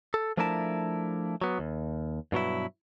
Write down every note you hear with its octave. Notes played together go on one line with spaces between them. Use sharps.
A4
F3 A3 D4 E4 A#4 A5
F#3 B3
D#2
G2 B2 F#3 E4